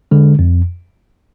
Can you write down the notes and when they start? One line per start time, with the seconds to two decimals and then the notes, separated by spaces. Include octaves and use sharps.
0.11 D3 G#3
0.39 F2